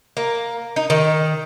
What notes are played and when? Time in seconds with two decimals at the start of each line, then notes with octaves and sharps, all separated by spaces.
0.17 A#3
0.76 D#4
0.90 D#3